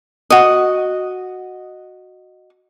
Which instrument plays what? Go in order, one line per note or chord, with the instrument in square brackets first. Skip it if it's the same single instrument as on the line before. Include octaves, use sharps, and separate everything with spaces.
[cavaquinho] F#4 D#5